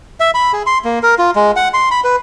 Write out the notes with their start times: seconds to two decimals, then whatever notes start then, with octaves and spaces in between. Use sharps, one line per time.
0.20 E5
0.34 B5
0.53 G#4
0.67 C6
0.85 A#3
1.03 A#4
1.19 F4
1.36 G#3
1.56 F#5
1.74 C6
1.91 B5
2.04 B4